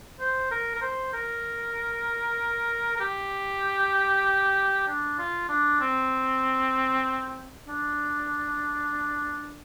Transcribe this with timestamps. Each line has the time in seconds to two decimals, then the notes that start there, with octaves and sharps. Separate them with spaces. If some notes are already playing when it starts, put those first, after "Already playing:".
0.20 C5
0.51 A#4
0.75 A#4
0.82 C5
1.14 A#4
2.96 A#4
3.00 G4
4.87 D4
5.19 F4
5.49 D4
5.81 C4
7.67 D4